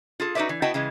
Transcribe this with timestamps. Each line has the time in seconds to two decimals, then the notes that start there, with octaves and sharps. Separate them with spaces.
0.20 F4 G#4 A4
0.35 D#4 F#4 G#4 B4 D5 E5
0.49 E3
0.62 B3 E4 F#4 D#5 G5 A5
0.74 C#3 E3 G#3